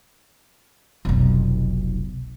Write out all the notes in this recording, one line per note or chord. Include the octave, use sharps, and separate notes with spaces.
F1 B1